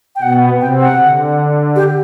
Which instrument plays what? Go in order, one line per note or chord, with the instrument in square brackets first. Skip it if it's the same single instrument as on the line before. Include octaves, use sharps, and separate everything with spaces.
[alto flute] G5
[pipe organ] B2 B3 [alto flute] F#5
[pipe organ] C3 C4 [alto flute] G5
[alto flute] F#5
[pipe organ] D3
[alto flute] G4